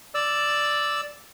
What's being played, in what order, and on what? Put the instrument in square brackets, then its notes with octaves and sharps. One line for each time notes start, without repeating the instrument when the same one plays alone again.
[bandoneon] D5 E6